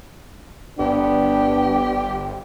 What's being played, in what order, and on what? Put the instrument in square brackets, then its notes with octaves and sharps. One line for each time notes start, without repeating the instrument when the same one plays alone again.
[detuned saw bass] G1 [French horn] B3 [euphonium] D4 [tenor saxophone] G4